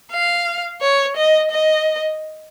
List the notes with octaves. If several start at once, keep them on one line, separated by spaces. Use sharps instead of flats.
F5
C#5
D#5
D#5